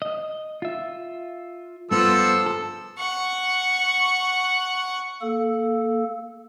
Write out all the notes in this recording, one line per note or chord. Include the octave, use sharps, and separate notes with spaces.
D#5
F4 E5
G2 F3 B3 A4 E6
A4
F#5 C#6
A#3 A4